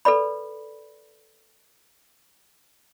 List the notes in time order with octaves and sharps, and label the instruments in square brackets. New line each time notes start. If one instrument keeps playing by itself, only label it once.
[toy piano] A4 B4 D5 B5